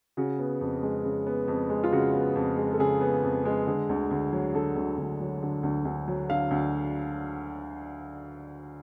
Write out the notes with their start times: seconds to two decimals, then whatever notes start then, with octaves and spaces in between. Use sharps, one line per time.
0.17 C#3 F#4
0.39 B3
0.61 F2
0.83 G#3
1.04 C#3
1.26 B3
1.48 F2
1.70 G#3
1.84 F4
1.92 C#3 F#4
2.14 B3
2.35 F2
2.57 G#3
2.73 A4
2.79 C#3 G#4
3.01 B3
3.23 F2
3.45 G#3
3.67 D3
3.89 D2
4.11 D2
4.33 F#3
4.54 D3 A4
4.76 D2
4.98 D2
5.20 F#3
5.42 D3
5.63 D2
5.85 D2
6.08 F#3
6.29 D3 F5
6.51 D2